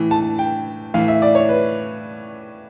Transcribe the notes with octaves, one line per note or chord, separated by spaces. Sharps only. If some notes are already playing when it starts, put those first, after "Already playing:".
Already playing: A2 E3
A5
G5
A2 E3 F5
E5
D5
C#5
B4